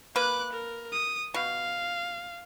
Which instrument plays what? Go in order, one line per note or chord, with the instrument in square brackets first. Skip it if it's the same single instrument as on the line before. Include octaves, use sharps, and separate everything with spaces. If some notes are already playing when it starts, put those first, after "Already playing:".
[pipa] A#3 B4 [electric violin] D6 F#6
[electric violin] A#4
D#6
[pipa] B2 [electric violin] F5